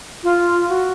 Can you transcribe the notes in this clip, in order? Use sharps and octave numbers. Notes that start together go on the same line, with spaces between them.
F4
F#4